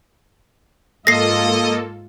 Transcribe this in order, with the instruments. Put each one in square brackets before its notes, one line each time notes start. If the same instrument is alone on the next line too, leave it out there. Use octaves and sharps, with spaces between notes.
[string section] G#2 F4 [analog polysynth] A#3 A4 [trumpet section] D#5 [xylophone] A#6 C7